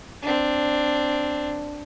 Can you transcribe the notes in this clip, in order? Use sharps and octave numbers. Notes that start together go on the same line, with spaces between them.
C4 D4